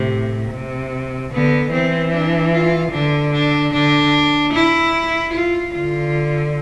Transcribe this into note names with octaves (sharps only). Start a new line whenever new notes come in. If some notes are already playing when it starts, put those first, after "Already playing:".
Already playing: A2 C3
C3
D3 B3
E3 C4
D4
F4
D3 D4
D4
D3 D4
E4
F4
D3 F4